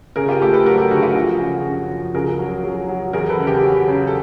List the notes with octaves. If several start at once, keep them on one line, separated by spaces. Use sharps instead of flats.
C#3 G#4 A#4
F4 G4
A3 G4 A4
A4 B4
F#3 G#4 A#4
G4 A4
D2 F#4 G#4
F4 G4
F3 F#4 G#4
C#3
F#2
F3
C#2 G#4 A#4
F#3
F#3
F#3
E2 G#4 A#4
A4 B4
C#3
G4 A4
F#3
C#3
A4